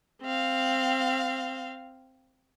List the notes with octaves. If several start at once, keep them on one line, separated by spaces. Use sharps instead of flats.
C4 F5